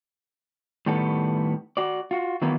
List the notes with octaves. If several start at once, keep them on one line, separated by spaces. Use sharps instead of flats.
A2 D#3 G3 B3 A4
F#4 D5
F4 F#4
D#3 E3 F#3 A#3 B3